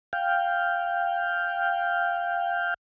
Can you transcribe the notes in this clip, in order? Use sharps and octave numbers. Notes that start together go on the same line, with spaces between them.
F5 G5